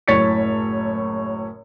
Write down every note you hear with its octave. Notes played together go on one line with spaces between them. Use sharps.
F#1 A2 C#5 A6 B6 C#7